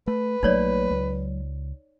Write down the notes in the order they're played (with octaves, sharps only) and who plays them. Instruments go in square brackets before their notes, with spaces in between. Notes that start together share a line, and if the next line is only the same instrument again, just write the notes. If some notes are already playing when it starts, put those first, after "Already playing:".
[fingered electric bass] A3 [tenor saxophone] B4
[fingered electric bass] A#1 A3 A#3 [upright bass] F#3 [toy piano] D#4 C#5 D5
[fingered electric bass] C#2